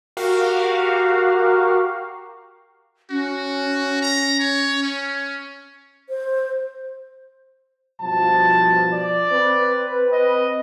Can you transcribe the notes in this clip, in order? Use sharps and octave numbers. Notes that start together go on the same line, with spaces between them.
F#4 G4 A#4 F5
C#4 F#4
A#5
C#5
C#4
C5
G2 B2 F3 A5
D5
C4 B4
D#5